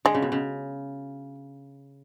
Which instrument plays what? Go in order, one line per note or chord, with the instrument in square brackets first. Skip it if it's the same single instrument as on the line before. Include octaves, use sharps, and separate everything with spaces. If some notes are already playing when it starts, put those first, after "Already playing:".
[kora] D3 [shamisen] G#3
[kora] C#3
B2
C#3